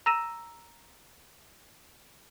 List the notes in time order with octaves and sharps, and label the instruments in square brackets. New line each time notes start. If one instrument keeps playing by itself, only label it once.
[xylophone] A#5 E6 A#6 D#7 E7